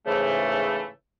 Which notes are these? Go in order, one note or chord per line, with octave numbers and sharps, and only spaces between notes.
G#2 C#3 E3 A3